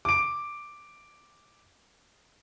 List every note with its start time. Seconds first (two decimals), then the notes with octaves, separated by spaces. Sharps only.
0.05 D6 D7